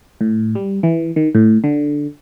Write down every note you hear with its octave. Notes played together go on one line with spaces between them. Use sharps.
A2
G3
E3
D#3
A2
D3